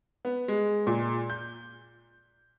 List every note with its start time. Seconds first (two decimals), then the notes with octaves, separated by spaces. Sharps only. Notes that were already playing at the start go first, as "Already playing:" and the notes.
0.25 B3
0.48 G#3
0.87 A#2
1.30 G6